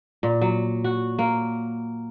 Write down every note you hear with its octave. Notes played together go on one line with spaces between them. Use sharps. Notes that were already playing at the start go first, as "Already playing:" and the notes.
A#2
F#3
F#4
A#3